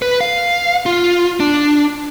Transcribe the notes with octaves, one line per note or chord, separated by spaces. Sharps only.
B4
F5
F4
D4